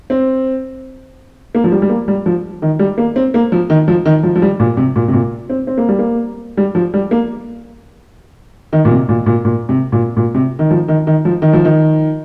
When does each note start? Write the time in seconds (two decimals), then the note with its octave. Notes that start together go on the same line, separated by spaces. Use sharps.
0.10 C4
1.55 A#3
1.64 F3
1.72 G3
1.82 G3
1.89 A#3
2.08 G3
2.26 F3
2.62 D#3
2.79 G3
2.98 A#3
3.16 C4
3.34 A#3
3.52 F3
3.70 D#3
3.88 F3
4.06 D#3
4.23 F3
4.36 F3
4.42 G3
4.60 A#2
4.77 C3
4.96 A#2
5.08 C3
5.13 A#2
5.50 C4
5.67 C4
5.78 A#3
5.89 G3
5.99 A#3
6.57 G3
6.75 F3
6.94 G3
7.11 A#3
8.73 D#3
8.85 A#2
8.90 C3
9.09 A#2
9.26 A#2
9.45 A#2
9.69 C3
9.92 A#2
10.17 A#2
10.35 C3
10.59 D#3
10.71 F3
10.88 D#3
11.07 D#3
11.25 F3
11.42 D#3
11.53 F3
11.65 D#3